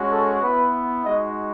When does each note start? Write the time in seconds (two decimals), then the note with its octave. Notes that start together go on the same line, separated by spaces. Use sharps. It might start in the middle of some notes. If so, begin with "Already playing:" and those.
Already playing: G#3 C#4 F#4
0.10 A4
0.42 B3 E4 B4
1.05 G#3 D#4 F#4 D#5